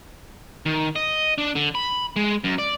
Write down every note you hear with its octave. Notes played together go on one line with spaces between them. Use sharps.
D#3
D#5
D4
D3
B5
G#3
F#2
D5